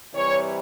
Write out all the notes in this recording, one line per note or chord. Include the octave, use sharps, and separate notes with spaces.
C3 E3 G3 C#5